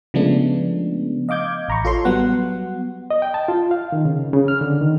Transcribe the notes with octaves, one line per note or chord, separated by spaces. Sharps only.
C#3 F3 G#3 A3 B3 D4
D#5 F5 D6 G6 G#6
A1 A#5 B5 C#6
F4 A4 C#5 C6
F#3 G3 B3 F#5
D#5
G5
A5
F4
F5
D#3
C#3
C#3
F6
D3
D#3